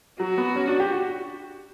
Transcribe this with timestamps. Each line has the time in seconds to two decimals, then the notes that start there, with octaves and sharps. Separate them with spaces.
0.20 F#3 F#4
0.38 B3
0.56 C#4
0.68 D4
0.80 G4
0.92 F#4